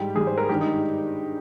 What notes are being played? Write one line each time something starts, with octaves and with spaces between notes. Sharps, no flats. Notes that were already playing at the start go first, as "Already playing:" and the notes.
Already playing: G#2 G3 G4
G#2 G3 G#4
C5
A#4
G2 D#3 G#3 G4
D#4